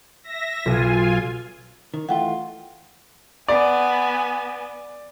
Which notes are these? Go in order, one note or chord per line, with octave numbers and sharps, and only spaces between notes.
E5 A#6
B1 F4 G#5
D#3
E3 A3 F4 F#5 G5
B3 D5 G#5